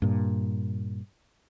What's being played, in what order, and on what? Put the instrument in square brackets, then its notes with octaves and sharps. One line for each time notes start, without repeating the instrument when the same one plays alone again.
[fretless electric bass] G2 A#2